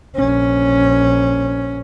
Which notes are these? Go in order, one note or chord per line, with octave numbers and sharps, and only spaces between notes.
A#1 C#4